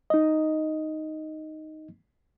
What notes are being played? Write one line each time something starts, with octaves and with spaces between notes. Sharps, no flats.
D#4 D#5